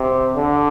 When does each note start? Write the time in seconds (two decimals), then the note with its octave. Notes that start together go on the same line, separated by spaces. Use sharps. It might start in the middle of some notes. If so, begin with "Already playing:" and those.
Already playing: C3
0.36 D3